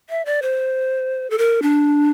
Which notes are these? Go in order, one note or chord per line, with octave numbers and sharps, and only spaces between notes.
E5
D5
C5
A4
A#4
D4